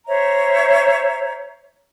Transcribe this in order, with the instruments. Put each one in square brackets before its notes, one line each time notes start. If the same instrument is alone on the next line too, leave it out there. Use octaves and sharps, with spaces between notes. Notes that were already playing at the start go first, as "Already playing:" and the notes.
[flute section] C5 C#5 E5 A#5